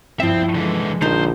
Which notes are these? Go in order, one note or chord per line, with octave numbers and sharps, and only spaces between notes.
G2 F3 C4 E4 E5
D3 E3 G#3
A#1 D3 A#3 D#4 C5